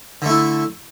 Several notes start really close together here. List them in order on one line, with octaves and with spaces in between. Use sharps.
D3 A3 E4